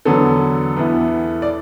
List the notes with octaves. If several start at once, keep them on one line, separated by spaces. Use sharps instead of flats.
E2 D3 F#3 B3 A4
E2 E3 B3 E4
D5